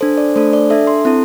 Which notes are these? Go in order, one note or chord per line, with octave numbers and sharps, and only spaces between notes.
D4 A4 C5
D5
A3 D4 A4 C5
D5
D4 A4 E5
C6
C4 E4 A4